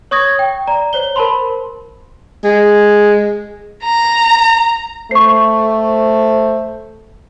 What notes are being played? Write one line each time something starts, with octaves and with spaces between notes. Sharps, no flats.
C#5 C#6 D#6 G#6 A#6
G5
D5 A#5
C5 C#5 G7
A#4 C5 A5 B5 C6
G#3
A#5
A3 C5 C#6 C7